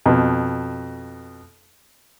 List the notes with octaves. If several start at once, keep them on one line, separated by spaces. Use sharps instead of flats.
F2 B2